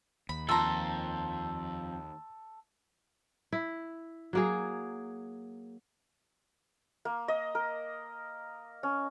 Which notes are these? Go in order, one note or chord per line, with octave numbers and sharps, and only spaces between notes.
D#2 B5
F2 A4 A5 A#5 C6 E6
E4
F#3 A#3 G#4
A#3
D#5
A#4
C#4